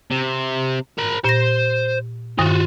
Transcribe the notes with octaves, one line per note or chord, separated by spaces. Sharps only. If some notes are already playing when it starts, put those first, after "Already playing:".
C3
A#4 B5
A#2 C5 A#6
G2 D#3 F4 F#4